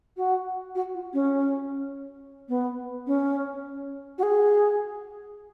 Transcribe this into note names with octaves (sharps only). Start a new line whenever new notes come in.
F#4
F#4
F4
C#4
B3
C#4
F#4
G#4